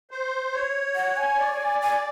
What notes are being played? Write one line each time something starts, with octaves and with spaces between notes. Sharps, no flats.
C5
C#5
F#5
G#5
D5
C#5
D5
G#5